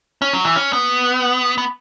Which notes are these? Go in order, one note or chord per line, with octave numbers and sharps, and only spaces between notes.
C#4
F#3
E3
C#4
B3
B3